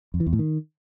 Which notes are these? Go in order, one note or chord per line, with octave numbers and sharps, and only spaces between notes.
F2
E3
E2
A2
D#3